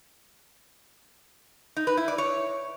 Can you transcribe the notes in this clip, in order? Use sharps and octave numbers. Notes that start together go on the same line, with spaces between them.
D#4
B4
E4
D5
C#5